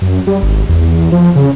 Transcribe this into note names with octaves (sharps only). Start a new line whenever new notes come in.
F#2
G3
G#1
E2
F3
C#3